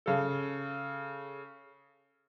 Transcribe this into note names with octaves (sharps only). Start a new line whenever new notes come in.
C#3 A4